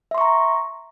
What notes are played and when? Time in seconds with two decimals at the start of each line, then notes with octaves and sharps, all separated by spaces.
0.11 E5
0.15 C6
0.18 C#6
0.21 A#5